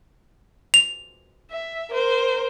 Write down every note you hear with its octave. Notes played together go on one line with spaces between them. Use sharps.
F7
E5
A#4 C5